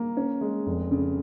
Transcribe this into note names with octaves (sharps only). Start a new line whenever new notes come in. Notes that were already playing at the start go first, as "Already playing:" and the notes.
Already playing: A#3
C#4
G#3
F1
C#3